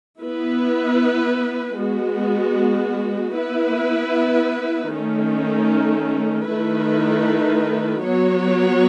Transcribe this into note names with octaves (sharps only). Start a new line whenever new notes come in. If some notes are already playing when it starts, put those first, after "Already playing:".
B3 E4 B4
G#3 B3 F#4
B3 E4 B4
D#3 A3 C#4
D#3 A3 E4 B4
F#3 B3 F#4 C#5